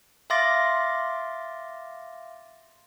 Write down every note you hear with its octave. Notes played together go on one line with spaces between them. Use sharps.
E5 F5 C6 D6 A6 A#6